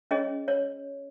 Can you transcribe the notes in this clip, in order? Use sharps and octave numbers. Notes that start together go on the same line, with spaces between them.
C#4 G#4 C#5 D#5
C#5